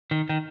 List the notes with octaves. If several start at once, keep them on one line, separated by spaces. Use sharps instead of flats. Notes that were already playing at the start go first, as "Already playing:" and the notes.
D#3
D#3